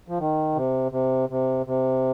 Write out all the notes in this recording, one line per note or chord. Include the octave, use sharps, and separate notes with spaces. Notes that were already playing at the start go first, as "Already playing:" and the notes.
F3
D#3
C3
C3
C3
C3